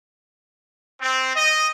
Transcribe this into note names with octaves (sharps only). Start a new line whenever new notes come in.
C4
D#5